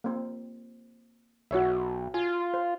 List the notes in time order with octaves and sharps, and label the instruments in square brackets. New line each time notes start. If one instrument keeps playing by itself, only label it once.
[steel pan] A#3 C4
[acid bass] B1 [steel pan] F#4 C#5 E5
[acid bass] F4 [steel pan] G#5
[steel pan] C5